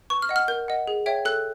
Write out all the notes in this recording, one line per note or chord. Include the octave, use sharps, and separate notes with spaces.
B4 C#6
F6
D#5 F#5
F6
A#4 G6
D#5 F#5
G#4
C#5 E5 G5
A4 F#6